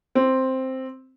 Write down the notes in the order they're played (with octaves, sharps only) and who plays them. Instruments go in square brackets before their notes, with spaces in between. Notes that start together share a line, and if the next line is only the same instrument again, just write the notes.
[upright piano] C4